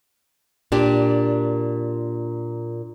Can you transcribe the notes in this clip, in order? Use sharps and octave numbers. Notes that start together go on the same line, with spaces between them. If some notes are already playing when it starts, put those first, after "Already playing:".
A#2 D4 G4